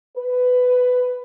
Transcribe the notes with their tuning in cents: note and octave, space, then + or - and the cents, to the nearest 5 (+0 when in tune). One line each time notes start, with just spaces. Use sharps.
B4 +15